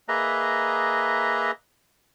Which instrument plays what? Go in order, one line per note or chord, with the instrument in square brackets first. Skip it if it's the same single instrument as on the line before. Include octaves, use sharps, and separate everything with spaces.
[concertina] A#3 G#4 B4 D#5 E5 A#5